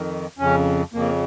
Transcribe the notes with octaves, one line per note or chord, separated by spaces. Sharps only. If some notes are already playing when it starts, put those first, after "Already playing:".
Already playing: F2 D#3
F2 C#3 C#4
F2 C#3 A#3